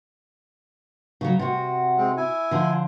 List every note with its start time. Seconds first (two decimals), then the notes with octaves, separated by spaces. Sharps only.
1.21 C#3 F#3
1.39 C3 F#4
1.97 G#3 C4
2.17 E4 G#5
2.51 D3 F3